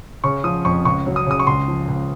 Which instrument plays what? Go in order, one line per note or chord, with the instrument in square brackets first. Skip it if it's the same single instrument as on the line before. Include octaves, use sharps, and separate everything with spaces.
[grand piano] C#3 C#6
F3 D#6
F2 C#6
C#2 C#6
F#3
D#6
C#3 D#6
C#6
C#2 C6
F3
C#2